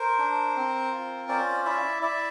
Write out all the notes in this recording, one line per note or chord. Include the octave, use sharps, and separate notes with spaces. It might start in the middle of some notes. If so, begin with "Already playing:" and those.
Already playing: A#4 C5
D4
C4
F4
C#4 C5 D5
E4 D5 E5
E4 D5 E5